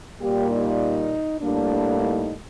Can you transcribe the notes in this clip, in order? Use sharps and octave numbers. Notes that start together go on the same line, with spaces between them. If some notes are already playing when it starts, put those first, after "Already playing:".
A#2 G3 A#3 G4
D#4
A2 G3 A#3 D4
D#4